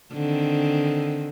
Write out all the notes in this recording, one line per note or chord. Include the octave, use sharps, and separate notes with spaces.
D3 D#3 C4